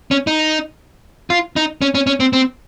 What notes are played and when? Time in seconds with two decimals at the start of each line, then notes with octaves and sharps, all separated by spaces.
0.11 C#4
0.27 D#4
1.30 F4
1.56 D#4
1.82 C#4
1.95 C#4
2.07 C#4
2.20 C4
2.33 C4